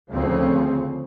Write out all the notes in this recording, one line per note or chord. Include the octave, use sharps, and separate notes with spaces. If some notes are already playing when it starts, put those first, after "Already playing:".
D2 C#3 F3 C4 C#4